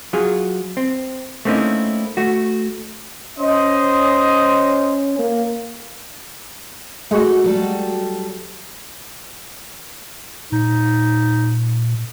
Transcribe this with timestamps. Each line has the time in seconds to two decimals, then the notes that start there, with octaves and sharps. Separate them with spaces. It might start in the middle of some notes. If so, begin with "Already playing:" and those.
0.13 F#3 F4 G#4
0.77 C4
1.45 A3 A#3 C4 C#4 D#4 E4
2.17 A3 F#4
3.39 C#4 C5 D#5
5.19 A#3
7.11 G#3 A3 F#4
7.44 F#3 G3 A4
10.52 A#2 D#4